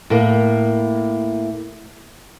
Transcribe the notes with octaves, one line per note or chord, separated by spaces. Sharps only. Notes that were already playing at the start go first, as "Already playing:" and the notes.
A2 A#3